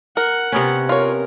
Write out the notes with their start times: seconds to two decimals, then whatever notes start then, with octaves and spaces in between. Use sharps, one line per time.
0.17 A#4 F#5
0.52 C3 B3 C#4
0.89 F4 A#4 C#5